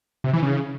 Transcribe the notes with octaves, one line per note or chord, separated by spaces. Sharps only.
C3
E3
C#3